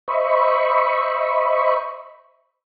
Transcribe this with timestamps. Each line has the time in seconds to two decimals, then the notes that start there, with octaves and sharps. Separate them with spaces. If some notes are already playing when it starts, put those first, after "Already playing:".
0.08 C5 D#5 E5 B5 C#6